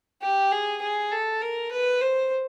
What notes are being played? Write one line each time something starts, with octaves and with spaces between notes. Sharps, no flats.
G4
G#4
G#4
A4
A#4
B4
C5